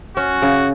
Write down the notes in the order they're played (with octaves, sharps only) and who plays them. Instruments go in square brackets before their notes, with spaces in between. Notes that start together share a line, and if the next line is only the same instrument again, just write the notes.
[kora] C#4 [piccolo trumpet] F#4
[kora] C#3